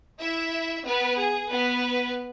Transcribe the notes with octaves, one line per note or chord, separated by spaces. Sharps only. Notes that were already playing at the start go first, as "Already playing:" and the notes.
E4 E5
B3 B4
G#4
B3 B4